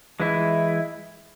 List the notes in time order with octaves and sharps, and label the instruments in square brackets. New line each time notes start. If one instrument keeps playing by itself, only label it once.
[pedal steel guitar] E3 G#3 E4